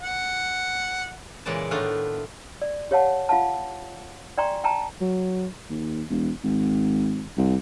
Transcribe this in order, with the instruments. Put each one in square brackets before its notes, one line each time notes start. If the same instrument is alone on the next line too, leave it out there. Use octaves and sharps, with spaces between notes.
[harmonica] F#5
[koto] A#2 C#3 E3 G#3 D5 A5
A2 D#3 A3 B3 D4 F4
[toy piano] D5
G4 C#5 F5 F#5 A5
F4 F5 F#5 A5
D5 G5 G#5 A#5 C6 C#6
G5 A5 A#5
[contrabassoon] F#3
D#2
E1
G#1
C2